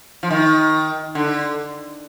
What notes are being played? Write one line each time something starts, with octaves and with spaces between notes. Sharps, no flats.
F3
D#3
D3